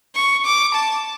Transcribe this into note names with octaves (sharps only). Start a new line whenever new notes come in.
C#6
D6
A5